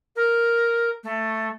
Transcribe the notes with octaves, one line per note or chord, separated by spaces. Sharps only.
A#4
A3